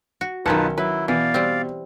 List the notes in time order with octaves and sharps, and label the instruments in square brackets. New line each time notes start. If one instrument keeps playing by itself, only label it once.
[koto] F#4
[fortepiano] B1 A5 [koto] D#3 C#4 F#5 [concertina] D#4 F4 B4
[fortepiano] F#3 [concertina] E4 [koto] B4
[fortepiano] B2 [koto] E3 [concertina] D5 F5
[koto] G3 C4